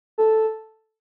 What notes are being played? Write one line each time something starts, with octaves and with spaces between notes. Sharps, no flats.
A4